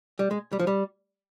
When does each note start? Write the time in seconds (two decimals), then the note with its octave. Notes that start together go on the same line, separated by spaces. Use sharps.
0.19 G3
0.31 G#3
0.53 G3
0.59 F3
0.67 G3